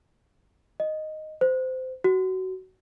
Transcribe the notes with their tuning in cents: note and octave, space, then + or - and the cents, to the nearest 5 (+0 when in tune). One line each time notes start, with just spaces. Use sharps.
D#5 -5
C5 -20
F#4 +20